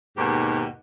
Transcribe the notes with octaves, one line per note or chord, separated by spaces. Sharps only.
D#2 G#2 B2 G4